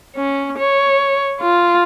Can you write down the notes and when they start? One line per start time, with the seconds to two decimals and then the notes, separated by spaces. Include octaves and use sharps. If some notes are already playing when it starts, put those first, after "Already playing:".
0.16 C#4
0.58 C#5
1.41 F4